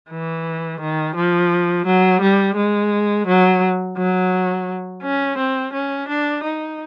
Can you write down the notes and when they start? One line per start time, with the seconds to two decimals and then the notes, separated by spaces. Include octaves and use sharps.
0.10 E3
0.81 D#3
1.16 F3
1.86 F#3
2.21 G3
2.57 G#3
3.27 F#3
3.97 F#3
5.03 C#4
5.38 C4
5.73 C#4
6.08 D4
6.44 D#4